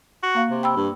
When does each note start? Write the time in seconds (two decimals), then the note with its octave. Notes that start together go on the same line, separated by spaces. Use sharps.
0.23 F#4
0.35 A#3 F5
0.51 C3
0.63 G5 B5 E6
0.76 G2